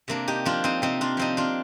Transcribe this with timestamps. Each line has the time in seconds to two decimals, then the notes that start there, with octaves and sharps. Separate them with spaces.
0.08 C3 A#3 D4
0.28 D#4 G4
0.45 F3 D4 F4
0.64 C4 D#4
0.82 C3 C4 D#4
1.01 D4 F4
1.17 F3 C4 D#4
1.37 D4 F4